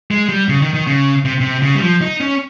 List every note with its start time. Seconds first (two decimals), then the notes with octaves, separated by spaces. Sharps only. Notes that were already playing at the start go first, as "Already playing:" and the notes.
0.11 G#3
0.29 G3
0.49 C#3
0.62 D#3
0.74 D#3
0.87 C#3
1.25 C3
1.41 C3
1.62 C#3
1.75 G3
1.82 F3
2.02 D#4
2.20 C#4